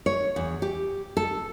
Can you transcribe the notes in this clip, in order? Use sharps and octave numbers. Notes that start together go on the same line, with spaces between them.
C#5
E2
G4
A4